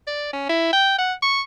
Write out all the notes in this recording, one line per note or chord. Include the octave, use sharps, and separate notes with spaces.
D5
C#4
E4
G5
F#5
C#6